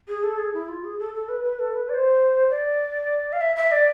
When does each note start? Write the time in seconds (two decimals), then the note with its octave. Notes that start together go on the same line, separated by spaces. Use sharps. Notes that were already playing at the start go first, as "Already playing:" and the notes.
0.08 G#4
0.23 A4
0.38 G#4
0.53 E4
0.68 F4
0.84 G#4
0.99 A4
1.14 A4
1.29 B4
1.44 B4
1.59 A4
1.74 B4
1.89 D5
1.94 C5
2.50 D5
3.32 F5
3.41 E5
3.56 E5
3.71 D5